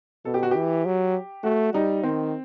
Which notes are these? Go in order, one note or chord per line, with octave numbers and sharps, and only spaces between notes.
B2 A4
G4
F#4
E3 G4
F#3
A3 F#4
G3 D#4
D#3 C4